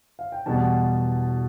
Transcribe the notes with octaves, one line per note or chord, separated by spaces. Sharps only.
F5
G5
E2 B2 G3 B3 A5